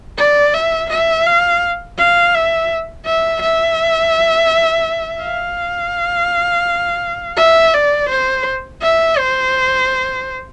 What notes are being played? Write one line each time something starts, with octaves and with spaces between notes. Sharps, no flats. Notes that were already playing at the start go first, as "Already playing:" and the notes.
D5
E5
E5
F5
F5
E5
E5
E5
F5
E5
D5
C5
E5
C5